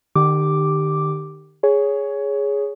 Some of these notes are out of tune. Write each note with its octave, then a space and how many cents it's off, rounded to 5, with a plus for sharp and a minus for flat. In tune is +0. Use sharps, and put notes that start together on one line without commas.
D#3 -45 G4 +0 D6 +0
G#4 +0 C#5 +10